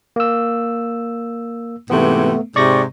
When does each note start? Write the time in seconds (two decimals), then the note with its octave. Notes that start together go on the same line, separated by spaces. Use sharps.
0.16 A#3 E6
1.90 G#2 C3 E3 A3 B3
2.56 G#2 C3 D5 C#6 A#6